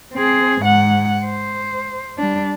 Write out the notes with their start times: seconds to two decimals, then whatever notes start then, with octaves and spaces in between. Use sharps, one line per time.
0.14 C4 G#4
0.61 G#2 F#5
1.25 C5
2.18 G3 D4